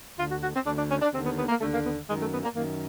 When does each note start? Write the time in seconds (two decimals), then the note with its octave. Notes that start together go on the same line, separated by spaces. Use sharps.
0.18 D2 D3 F4
0.30 F#4
0.42 F#4
0.53 C4
0.65 D2 D3 D4
0.77 D4
0.89 C#4
1.01 D4
1.12 D#2 D3 C4
1.25 B3
1.37 B3
1.48 A#3
1.60 D3 A3
1.64 D#2
1.72 A#3
1.84 B3
2.07 F#2 D#3 G#3
2.19 A3
2.31 B3
2.43 A#3
2.55 F#2 D#3 A#3